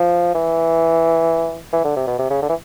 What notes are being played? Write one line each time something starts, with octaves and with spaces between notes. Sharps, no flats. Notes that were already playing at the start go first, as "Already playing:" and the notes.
Already playing: F3
E3
E3
D3
C3
B2
C3
C#3
D3
E3